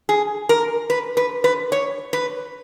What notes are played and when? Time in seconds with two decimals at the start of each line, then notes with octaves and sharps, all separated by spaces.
0.09 G#4
0.49 A#4
0.90 B4
1.17 B4
1.44 B4
1.72 C#5
2.13 B4